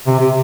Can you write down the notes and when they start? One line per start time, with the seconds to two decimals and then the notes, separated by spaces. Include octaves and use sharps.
0.07 C3
0.20 C3